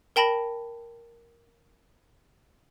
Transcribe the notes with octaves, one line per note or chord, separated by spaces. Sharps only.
A#4 G5 A5 B5 A#6